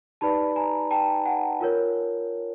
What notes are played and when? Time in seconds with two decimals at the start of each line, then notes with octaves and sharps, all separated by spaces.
0.21 D#4 G4 B4 D5 A5 B5
0.56 G#5 A#5
0.91 G5 A5
1.26 F#5 G#5
1.60 F4 A#4 C#5